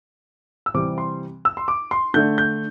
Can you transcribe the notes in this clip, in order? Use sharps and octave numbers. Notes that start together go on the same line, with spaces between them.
E6
C3 E3 G3 C4 D6
C6
E6
C6
D6
C6
D3 A3 D4 G6
G6